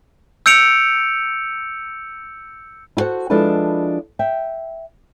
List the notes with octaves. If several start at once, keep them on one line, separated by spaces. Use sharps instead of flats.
E6 G6 C#7 D7 F7
E4 F#4 A4 C5 F#5
F3 G#3 D4 E4 A4 B4
E5 G5